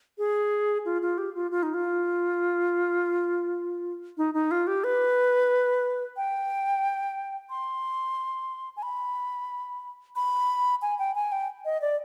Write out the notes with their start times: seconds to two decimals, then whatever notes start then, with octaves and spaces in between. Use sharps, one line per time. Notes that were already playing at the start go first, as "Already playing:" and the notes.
0.18 G#4
0.85 F4
1.02 F4
1.18 G4
1.35 F4
1.51 F4
1.63 D#4
1.74 F4
4.18 D#4
4.34 D#4
4.51 F4
4.67 G4
4.84 B4
6.17 G5
7.50 C6
8.77 G#5
8.83 B5
10.16 B5
10.82 G#5
10.99 G5
11.15 G#5
11.32 G5
11.65 D#5
11.81 D5